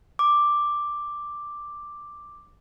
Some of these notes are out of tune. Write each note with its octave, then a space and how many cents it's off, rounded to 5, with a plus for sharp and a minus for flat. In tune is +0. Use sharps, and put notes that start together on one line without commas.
D6 +5